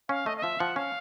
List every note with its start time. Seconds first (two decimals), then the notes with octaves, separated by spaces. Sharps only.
0.09 C#4 F5
0.26 A3 D#5
0.37 D#5
0.43 F3 E5
0.60 F3 F#5
0.76 C#4 F5